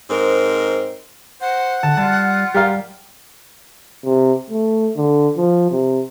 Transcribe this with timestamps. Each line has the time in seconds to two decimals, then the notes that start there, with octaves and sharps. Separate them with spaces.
0.10 G#2 G#3 C4 A#4
1.41 C5 F#5
1.83 D3 A5
1.97 G3 F4 A5
2.54 G3 G4 A#4 F5
4.05 C3
4.50 A3
4.96 D3
5.37 F3
5.72 C3